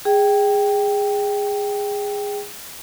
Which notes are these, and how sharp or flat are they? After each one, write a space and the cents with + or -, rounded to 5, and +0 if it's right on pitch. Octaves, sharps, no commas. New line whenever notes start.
G#4 -15 G5 +0